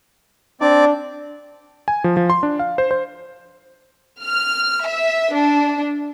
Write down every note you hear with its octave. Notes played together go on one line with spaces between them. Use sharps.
C4 D4 D5
G#5
F3
F3
C6
D4
F5
C5
C5
F6
E5
D4